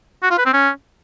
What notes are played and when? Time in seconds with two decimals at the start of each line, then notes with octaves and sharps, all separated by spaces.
0.23 F#4
0.31 F4
0.38 B4
0.46 C4
0.53 C#4